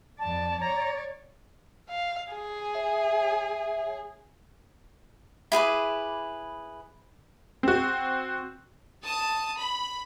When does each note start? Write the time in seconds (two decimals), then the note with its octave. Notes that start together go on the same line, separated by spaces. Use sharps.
0.19 F2 D5 A5
0.61 C#5 D5 A#5
1.90 F5
2.33 G#4
2.75 C#5 E5
5.52 E4 G#4 B4 D6
7.63 C4 F#4
9.05 A5 D#6
9.58 B5